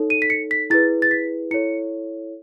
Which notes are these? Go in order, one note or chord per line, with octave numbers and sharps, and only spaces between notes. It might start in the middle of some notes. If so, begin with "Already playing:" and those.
Already playing: D#4 A4 C#5
D#7
B6
C#7
B6
E4 G#4 B4 A6
A6
B6
E4 A4 C#5 C#7